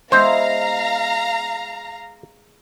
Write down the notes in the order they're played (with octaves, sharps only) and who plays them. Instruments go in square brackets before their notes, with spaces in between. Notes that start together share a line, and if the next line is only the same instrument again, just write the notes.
[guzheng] G#3 B3 E4 [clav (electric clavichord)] C5 [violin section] F5 A#5